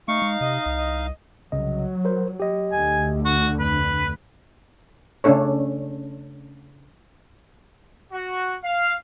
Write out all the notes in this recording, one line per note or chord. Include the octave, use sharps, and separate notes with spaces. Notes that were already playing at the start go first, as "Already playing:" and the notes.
A3 D#4 F5 C#6
G#3
C3 D#5
C2
D#5
C2 C#3 F#3 D#5
A#4 C5
G4 D#5
D2 D3 G#5
F#4
F2 B4
C#3 A3 C#4 D4 A4 C#5
F#4
F5